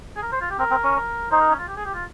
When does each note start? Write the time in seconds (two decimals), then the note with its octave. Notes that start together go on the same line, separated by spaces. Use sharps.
0.16 G#4
0.23 A#4
0.32 C5
0.41 F4
0.50 G4
0.59 C4 A#4
0.71 C4
0.84 C#4
0.95 A#4
1.31 D#4 C5
1.41 A#4
1.50 C#4
1.59 F4
1.68 G4
1.77 G#4
1.86 G4
1.94 F4